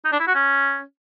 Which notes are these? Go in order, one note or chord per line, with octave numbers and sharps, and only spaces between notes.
D#4
D4
E4
F#4
C#4